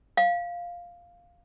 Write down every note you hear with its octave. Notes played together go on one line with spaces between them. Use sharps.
F5